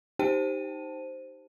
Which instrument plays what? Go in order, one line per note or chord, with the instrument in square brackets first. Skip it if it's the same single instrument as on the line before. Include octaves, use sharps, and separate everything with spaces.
[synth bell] D#4 G4 C5 G5 A5 D#7